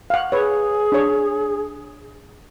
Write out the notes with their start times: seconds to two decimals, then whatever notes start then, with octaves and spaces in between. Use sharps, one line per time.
0.10 F5 F#5
0.32 G#4 B4 C#5
0.92 D4 C#5